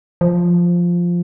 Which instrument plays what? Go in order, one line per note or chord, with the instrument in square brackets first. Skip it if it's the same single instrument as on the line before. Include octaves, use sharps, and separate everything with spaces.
[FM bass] F3